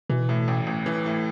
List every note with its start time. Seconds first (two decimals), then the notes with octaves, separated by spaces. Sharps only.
0.10 B2 E3
0.29 A2
0.48 A1
0.67 A1
0.86 E3
1.06 A2